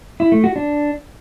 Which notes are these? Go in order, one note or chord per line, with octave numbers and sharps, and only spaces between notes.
E4
A3
F#4
D4